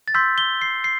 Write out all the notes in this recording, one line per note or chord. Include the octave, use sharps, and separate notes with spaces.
A6
C6 E6 G6 B6
G7
C7
C7